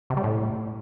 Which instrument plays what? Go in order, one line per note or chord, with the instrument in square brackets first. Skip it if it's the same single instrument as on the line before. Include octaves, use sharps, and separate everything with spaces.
[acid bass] C3
G3
A2